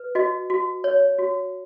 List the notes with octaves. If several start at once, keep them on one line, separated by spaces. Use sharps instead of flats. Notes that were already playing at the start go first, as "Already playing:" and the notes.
Already playing: B4
F#4 D#5
F#4
C#5
F#4